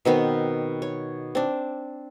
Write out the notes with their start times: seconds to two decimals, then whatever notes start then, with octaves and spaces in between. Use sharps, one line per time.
0.05 B2 D#3 B3 C4
0.82 C#5
1.35 C4 D4